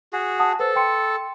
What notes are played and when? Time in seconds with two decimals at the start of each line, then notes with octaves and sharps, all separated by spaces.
0.13 F#4 G#4
0.39 F#5 A5 D#6
0.60 A4 B4 C5
0.76 G5 C6 C#7